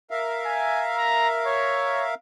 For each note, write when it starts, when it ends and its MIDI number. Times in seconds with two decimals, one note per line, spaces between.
0.11 2.15 70
0.11 2.15 76
0.11 2.15 77
0.46 0.84 80
0.98 1.28 82
1.47 2.06 73